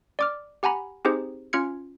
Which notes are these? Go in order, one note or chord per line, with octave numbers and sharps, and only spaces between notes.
D5 D6 F6
G4 F#5 G#5 A#5 B5
C4 D#4 G4 G#4 C5
C#4 F4 F6 G#6 C#7